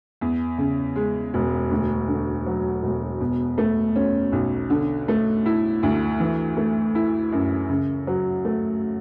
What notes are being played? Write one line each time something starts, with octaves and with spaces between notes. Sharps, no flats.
E2
C#3
G#3
E1
D2
D3
F#3
E1
B2
A3
C#4
B1
D3
A3
E4
D2
E3
A3
E4
F#2
C#3
F#3
A3